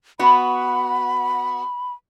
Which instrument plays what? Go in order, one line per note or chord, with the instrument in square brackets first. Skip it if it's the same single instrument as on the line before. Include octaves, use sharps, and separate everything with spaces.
[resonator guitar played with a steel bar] B3 F#4 [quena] B5